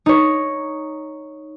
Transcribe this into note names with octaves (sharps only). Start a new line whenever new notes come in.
D#4 C#5